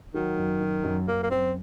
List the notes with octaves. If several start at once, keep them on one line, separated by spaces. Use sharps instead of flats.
D#3 F#3
F#2
F#2
F#2
F#2 A#3
A#3
F#2 C4